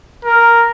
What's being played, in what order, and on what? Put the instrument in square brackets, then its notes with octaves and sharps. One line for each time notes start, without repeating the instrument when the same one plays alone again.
[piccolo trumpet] A#4